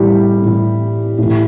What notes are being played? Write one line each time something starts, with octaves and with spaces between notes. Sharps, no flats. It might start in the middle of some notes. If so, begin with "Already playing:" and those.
Already playing: A2 E3 G3 G4
A2 E3
A2 E3